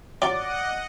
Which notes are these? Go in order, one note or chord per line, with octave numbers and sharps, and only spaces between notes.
F#3 F4 D5 D#5 F#5 D6